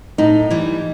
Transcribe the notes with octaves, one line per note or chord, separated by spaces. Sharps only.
A2 D#4
E3 G3